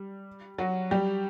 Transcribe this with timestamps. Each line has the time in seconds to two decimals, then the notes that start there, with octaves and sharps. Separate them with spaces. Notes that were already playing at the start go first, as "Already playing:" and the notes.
Already playing: G3
0.58 F#3 F#4
0.91 G3 G4